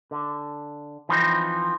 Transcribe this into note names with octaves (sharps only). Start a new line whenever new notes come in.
D3
E3 F3 C4 D#4